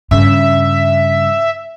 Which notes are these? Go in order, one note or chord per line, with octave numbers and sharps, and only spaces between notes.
G2 C#3 E5